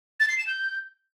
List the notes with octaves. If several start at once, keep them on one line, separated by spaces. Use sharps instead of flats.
A6
C7
E7
G6